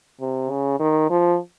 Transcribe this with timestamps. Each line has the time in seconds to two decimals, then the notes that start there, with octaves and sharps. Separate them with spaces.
0.21 C3
0.50 C#3
0.80 D#3
1.10 F3